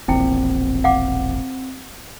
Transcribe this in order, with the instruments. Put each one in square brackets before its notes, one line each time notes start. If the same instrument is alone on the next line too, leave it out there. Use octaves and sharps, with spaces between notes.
[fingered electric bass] E1 A#1 [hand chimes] C4 [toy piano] E4 G5
[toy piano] F5 F#5 D6